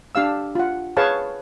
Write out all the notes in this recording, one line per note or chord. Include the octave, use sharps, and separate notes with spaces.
D4 G4 F5 E6
F4 F#5
G#4 B4 C#5 F5 A5 C#6